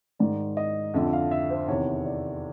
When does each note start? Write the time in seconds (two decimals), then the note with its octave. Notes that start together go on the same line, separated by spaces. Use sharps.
0.19 G#2 D#3 D5
0.57 D#5
0.94 F2 D3 E5
1.13 F5
1.31 E5
1.50 C5
1.68 E2 C3 D#3 C#5
2.06 D5